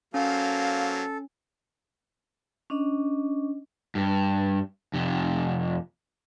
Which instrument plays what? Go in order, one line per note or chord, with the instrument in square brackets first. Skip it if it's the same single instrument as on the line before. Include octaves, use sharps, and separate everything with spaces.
[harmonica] F#3 A#3 C5 [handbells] C#4 [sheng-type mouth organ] A4 [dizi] F5
[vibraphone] C#4 D4 D#5
[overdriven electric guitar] G2
F2 C3